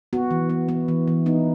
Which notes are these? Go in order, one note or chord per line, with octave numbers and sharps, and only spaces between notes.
B3 F#4
E3
B3
B3
E3
E3
B3 D#4